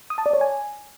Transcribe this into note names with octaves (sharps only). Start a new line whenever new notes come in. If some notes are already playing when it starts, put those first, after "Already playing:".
D#6
A5
D5
C#5
G#5